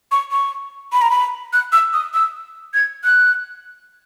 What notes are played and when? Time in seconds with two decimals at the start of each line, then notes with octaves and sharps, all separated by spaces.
0.12 C#6
0.32 C#6
0.93 B5
1.02 A#5
1.11 B5
1.53 F#6
1.72 E6
1.93 D#6
2.14 E6
2.74 G#6
3.04 F#6